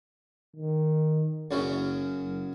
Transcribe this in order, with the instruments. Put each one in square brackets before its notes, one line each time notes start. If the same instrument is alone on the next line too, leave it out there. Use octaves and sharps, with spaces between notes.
[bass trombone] D#3
[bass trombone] F#1 [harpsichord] F#2 C#3 F#3
[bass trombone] F#1